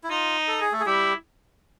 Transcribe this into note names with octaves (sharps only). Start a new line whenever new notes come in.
E4
D#4 F4
A4
G#4
A3 A4
G#4
G3 E4 G4